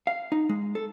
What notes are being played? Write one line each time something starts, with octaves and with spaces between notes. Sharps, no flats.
F5
D#4
G#3
A4